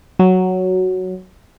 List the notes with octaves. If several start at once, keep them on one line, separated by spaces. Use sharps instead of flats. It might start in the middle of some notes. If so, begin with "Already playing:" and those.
F#3